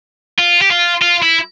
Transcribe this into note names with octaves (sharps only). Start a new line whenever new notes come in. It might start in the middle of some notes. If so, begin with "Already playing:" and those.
F4
G4
F4
F4
E4